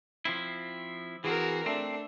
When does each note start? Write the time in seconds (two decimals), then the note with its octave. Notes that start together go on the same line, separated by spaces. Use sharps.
0.25 F3 C4 E4
1.24 E3 C4 F#4 G#4 A#4
1.66 A3 C4 D4